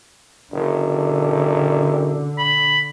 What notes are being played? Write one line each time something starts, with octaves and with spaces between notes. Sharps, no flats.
F#1 D3
B5